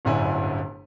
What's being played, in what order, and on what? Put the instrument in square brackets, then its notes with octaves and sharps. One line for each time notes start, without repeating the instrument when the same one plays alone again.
[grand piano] D1 G1 F#2 D3 E4 G#5